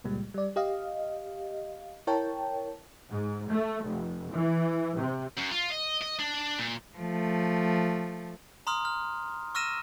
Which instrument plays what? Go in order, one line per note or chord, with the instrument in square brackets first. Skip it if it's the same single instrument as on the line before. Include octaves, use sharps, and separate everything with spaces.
[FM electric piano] C#2 A#2 G3 G#3
G3 D5
G4 D#5 F5
E4 A#4 C#5 G5 A5
[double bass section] G#2
A3
F1
E3
C3
[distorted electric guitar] F#2
F4
D#5
D#5
D4
A#2
[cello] F3 A3
[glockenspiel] A#5 C6 D#6 F6
F6
C#6 E6 F6 A#6 D#7 E7